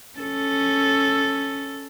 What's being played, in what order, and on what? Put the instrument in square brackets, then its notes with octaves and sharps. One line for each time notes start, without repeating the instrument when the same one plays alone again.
[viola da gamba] C#4 A4